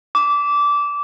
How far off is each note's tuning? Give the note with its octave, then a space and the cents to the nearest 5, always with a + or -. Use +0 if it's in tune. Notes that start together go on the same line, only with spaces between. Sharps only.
D6 -20